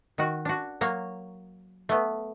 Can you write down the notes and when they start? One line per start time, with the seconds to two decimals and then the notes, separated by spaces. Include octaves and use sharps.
0.18 D#3 F#4
0.45 D4 F#4
0.81 F#3 A#3 C#5
1.89 A3 B3